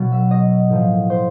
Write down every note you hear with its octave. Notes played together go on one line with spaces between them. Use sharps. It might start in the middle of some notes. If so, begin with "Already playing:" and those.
Already playing: B2 F#3
E5
D#5
A2 F3
C5